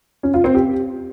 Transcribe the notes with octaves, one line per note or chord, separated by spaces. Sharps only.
C#4
F4
C4
G4